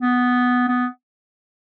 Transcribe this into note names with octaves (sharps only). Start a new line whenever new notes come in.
B3
B3